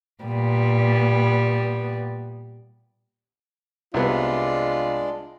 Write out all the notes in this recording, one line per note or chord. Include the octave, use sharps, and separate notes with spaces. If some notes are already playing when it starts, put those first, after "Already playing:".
A#2 G3 B3
C2 G#3 B3 D4 F4 D5